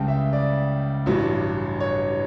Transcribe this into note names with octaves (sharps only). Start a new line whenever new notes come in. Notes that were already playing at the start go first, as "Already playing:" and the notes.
Already playing: C#2 C#3 G3 G5 A5
E5
D5
A1 G2 F#3
C#5